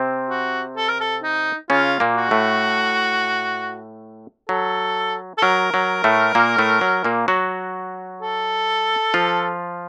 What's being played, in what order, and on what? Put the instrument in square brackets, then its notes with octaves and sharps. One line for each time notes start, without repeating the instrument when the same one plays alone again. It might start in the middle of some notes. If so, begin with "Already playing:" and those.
Already playing: [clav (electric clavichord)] C3 C4
[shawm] F#4
A4
A#4
A4
D#4
[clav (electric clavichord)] C#3 C#4 [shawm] F4
[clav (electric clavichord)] A#2 A#3
[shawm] F#4
[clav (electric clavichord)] A2 A3
[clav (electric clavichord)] F#3 [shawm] A4
[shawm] A4
[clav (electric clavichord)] F#3 [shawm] A#4
[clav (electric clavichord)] F#3
A2 A3
A#2 A#3
A2 A3
F#3
A#2 A#3
F#3 F#4
[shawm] A4
[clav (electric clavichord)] F3 F4